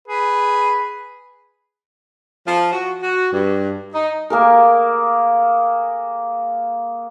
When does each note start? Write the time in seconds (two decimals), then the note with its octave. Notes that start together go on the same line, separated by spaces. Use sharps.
0.08 G#4 B4
2.47 F3
2.72 F#4
3.01 F#4
3.32 G2
3.93 D#4
4.30 A#3 G#4 A#4